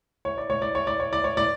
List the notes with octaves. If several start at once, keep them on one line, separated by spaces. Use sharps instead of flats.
C#5
D5
C#5
D5
C#5
D5
C#5
D5
C#5
D5